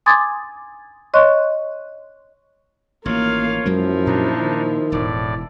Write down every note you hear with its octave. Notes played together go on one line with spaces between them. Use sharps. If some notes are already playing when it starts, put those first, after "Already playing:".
G#5 C6 D6 D#6 G#6 A6
C#5 D#5 C6 C#6 F#6
A1 D#3 A#3 F4 C#5 F5
F#2 F3 F#3 G#3 A#3 E4
A#2 D4 D#4
D#3
E1 A2 D5